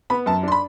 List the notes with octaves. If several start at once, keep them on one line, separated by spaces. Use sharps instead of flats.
B3 B5
F#2 A5
D4 C6
B5